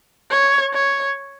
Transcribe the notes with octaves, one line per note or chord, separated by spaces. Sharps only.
C#5
C#5